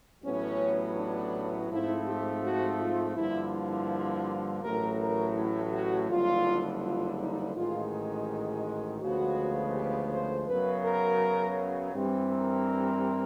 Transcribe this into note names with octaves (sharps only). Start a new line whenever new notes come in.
A1 A2 F#3 B3 C#4
D4
G#2 F3 A3 C4 E4
G4
F#4
F4
G2 D3 F3 A#3 E4
E4
A1 A2 F#3 A3 A#4
A#4
E4
F#4
F#1 F2 D3 G3 F4
F4
D#4
A1 G#2 D#3 G#3 F4
D2 C#3 F3 G#3 B3 F#4
G4
C5
F#2 C#3 F#3 B3 B4
A#4
G2 E3 G3 C4
A#4